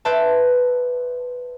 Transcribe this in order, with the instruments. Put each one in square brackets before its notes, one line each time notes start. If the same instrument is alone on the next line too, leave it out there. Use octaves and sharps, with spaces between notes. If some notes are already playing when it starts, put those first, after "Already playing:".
[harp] B4 C5 D5 E5 A5